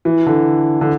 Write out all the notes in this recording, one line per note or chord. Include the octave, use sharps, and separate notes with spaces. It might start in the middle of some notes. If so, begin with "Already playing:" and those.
E3
D3
D3